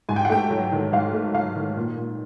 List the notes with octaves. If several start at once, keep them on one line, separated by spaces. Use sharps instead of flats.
G#2 G#5
G5
F#5
A3 G5
F#3
D#3
G#2 F5
A3
F#3 F5
D#3
A#2
A#2